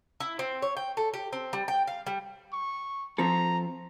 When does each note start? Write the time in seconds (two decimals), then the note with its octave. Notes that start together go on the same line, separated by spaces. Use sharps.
0.20 E4
0.39 C4
0.62 C#5
0.77 G5
0.97 A4
1.14 G4
1.33 C4
1.53 G3
1.68 G5
1.88 F5
2.07 G3
2.53 C#6
3.18 F3 C4 A4 A#5